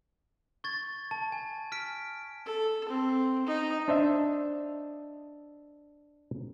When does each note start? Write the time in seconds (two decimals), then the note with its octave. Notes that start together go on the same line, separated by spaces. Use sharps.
0.64 C#6 G#6 A6
1.11 A5
1.32 G#5
1.72 F6 B6 D7
2.46 A4
2.88 C4
3.46 D#4
3.88 D4 C5 D#5 E5